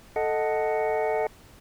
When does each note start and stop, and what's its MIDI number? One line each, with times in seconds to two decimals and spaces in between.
0.16 1.27 69
0.16 1.27 75
0.16 1.27 78